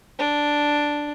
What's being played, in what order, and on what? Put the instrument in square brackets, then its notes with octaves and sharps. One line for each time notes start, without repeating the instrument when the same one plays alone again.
[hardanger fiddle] D4